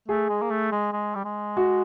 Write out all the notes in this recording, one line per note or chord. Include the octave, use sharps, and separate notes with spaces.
A3 G#4
G#3
A#3
A3
G#3
G#3
G3
G#3
F#4